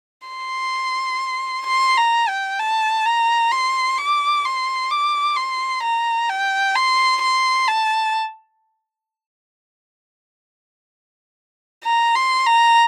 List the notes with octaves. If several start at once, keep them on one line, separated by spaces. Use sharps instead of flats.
C6
C6
A#5
G5
A5
A#5
C6
D6
C6
D6
C6
A#5
G5
C6
C6
A5
A#5
C6
A#5